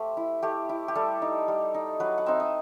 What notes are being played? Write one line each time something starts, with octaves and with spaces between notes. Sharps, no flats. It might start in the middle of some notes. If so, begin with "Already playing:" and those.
Already playing: A3 G4 C5
E4
A3 G4
E4
G4
G3 A4
D#4
G3
D#4
F#3 B4
F#5
C4 D#4 E5
D#5